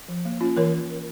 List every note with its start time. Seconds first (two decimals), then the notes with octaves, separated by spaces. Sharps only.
0.09 F3
0.25 A#3
0.41 C#4 F4
0.57 E3 A#4 C#5